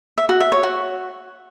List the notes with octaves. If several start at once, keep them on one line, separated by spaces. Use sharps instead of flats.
E5
F#4
E5
C#5
F#4